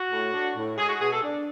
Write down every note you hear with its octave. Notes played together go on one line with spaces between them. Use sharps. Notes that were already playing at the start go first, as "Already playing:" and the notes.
Already playing: F#4
A2
D4
A2
G#3 G#4
F#4
B2 G#4
A4
D4